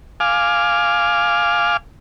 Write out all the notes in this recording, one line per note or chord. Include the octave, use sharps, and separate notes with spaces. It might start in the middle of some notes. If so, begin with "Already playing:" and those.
F5 G#5 D6 F6